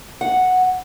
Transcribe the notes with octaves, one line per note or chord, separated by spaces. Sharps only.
F#5